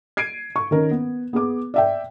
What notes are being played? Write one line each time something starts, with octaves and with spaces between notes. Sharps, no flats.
G#6 C7 D7 D#7
C#6
D#3 C#4 A#4
B3
B3 G#4 D6
D5 E5 G5